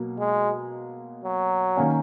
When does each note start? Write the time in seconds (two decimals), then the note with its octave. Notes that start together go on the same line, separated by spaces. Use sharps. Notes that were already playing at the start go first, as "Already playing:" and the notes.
Already playing: B2 F#3 A#3
0.19 G#3
1.24 F#3
1.77 D#3 A#3 C#4